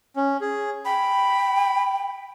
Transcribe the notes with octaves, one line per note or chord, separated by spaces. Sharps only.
C#4
G#4
G5 B5